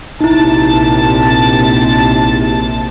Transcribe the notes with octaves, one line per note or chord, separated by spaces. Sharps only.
A#1 C3 D#4 E4 A5